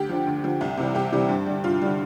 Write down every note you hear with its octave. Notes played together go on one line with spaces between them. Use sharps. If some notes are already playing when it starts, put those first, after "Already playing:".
Already playing: D2 G4
D3 F3
D2
D3 F3
C2
C3 E3 G3
C2 G4
C3 E3 G3
G2
D3 G3
G2 F4
D3 G3